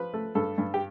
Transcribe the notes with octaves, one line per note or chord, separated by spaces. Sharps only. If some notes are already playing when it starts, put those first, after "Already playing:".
Already playing: F3 B4
A3
G2 A4
G2
G4